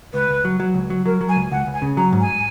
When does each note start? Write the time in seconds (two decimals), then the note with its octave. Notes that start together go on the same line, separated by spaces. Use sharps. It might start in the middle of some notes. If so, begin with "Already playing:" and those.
0.13 C#2 B4
0.29 C#2
0.45 F#3
0.60 F#3
0.74 C#2
0.90 F#3
1.06 F#3 A#4
1.21 F#3
1.29 G#5
1.36 C#2
1.51 C#2 F#5
1.67 C#2
1.74 G#5
1.82 C#3
1.97 F#3 A#5
2.13 G#2
2.21 G#5